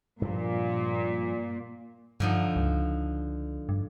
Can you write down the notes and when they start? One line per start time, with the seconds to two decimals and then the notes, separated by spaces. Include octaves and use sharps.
0.22 G2 A#2 F3
2.20 G2 D3 F3 D#4
2.56 C#2
3.69 G2